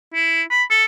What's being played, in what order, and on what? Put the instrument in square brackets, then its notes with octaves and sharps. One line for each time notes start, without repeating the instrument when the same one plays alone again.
[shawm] E4
B5
A4